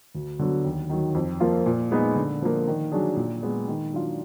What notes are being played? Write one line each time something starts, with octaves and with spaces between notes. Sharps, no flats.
D2
D3 F#3 B3
D#2
D#3 F#3
F2
F3 A#3 F4
A#2
G#3 B3 D#4 G#4
D3
F3 A#3
D#3
F#3 D4 G#4
A#2
G#3 B3
D#3
F#3 D4 F4